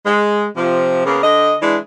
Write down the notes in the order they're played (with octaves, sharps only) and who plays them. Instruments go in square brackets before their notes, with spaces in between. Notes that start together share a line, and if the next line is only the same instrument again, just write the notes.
[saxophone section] G#3
C3 F3
C#3 A#3 B3
D3 D#5
E3 G#3 D4